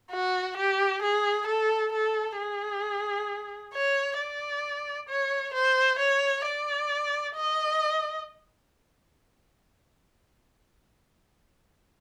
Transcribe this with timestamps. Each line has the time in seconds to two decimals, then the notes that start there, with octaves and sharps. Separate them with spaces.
0.11 F#4
0.57 G4
1.02 G#4
1.47 A4
1.93 A4
2.38 G#4
3.73 C#5
4.18 D5
5.09 C#5
5.54 C5
5.99 C#5
6.46 D5
7.35 D#5